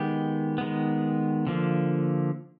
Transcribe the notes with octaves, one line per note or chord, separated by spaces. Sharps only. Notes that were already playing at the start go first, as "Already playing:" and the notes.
Already playing: D#3 G#3 B3 G4
D#3 G#3 B3
D3 F3 A#3